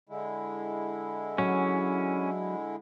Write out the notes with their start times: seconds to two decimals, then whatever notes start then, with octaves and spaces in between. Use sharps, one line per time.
0.09 D3 G#3 E4
1.38 F#3 C#4